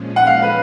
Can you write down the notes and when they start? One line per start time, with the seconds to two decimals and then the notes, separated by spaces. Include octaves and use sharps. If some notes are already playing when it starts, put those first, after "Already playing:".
Already playing: A#2 F3 G#3 C#4
0.16 F#5
0.27 F5
0.42 B4